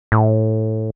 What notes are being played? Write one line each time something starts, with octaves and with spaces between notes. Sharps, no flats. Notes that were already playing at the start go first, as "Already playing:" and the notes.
A2